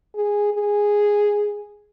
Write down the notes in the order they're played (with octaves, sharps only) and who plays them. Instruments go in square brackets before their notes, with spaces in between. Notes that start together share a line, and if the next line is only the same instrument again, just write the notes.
[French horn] G#4
G#4